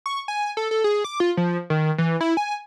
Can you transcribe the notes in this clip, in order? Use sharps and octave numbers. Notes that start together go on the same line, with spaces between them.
C#6
G#5
A4
A4
G#4
D6
F4
F3
D#3
E3
E4
G#5